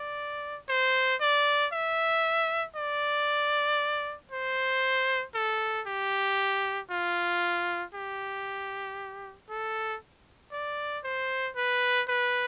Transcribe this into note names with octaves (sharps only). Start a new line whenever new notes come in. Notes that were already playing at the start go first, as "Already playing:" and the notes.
Already playing: D5
C5
D5
E5
D5
C5
A4
G4
F4
G4
A4
D5
C5
B4
B4